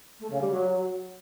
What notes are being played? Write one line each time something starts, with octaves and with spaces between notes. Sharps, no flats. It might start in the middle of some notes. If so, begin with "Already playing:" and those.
A3
C#3
G3
F#3